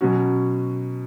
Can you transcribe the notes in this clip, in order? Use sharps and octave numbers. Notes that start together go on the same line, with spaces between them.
B2 F#3 C#4 F#4